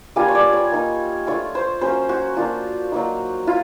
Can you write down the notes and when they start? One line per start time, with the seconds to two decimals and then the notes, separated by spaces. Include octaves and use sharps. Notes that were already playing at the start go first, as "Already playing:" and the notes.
0.16 G3 A#3 D4 F4 G#5
0.28 C#5
0.35 D5
0.53 C#5
0.72 A#3 D#4
1.27 A3 D4 F4 C#5
1.55 C5
1.81 F#3 A#3 C#4 C5
2.09 F#4
2.37 A#3 D4 F4
2.92 F#3 A#3 D#4
3.47 E4 F4